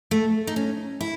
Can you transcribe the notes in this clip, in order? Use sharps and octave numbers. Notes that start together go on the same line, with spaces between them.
A3
D#4
C#4
E4